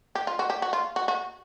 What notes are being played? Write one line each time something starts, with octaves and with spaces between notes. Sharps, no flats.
G4
F4
F#4
G4
F#4
F4
F#4
F#4